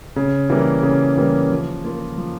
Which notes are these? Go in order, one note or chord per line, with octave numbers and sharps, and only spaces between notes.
C#3
E3 G3 A#3
C#3
E3 G3 A#3
F3
A#3 F4 A#4
F3